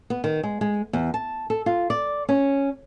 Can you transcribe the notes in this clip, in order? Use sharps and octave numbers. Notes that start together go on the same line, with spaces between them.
B3
D#3
G#3
G#3
E2
A5
A4
F4
D5
C#4